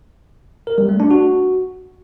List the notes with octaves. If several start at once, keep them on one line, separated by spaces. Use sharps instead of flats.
A#4
G3
A3
D4
F#4